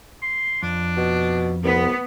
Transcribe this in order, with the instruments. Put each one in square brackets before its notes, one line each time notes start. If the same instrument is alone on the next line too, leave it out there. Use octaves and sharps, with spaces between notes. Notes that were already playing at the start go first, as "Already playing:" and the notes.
[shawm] C6
[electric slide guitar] F2 [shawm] D4
[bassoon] B2
[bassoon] C2 [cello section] B3